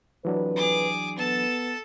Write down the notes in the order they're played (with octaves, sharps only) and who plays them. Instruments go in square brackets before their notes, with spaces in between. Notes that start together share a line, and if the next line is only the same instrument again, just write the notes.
[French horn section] F2 C3 B4 [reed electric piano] E3 F#3 D4
[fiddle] G#4 D6
[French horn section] B3 [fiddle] A4 A5